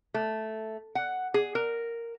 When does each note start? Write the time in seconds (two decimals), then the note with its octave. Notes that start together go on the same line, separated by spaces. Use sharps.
0.14 A3
0.95 F#5
1.34 G#4
1.55 A#4